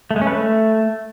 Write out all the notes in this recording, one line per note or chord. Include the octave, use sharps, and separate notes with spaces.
A3
G#3
C#4
B4
A3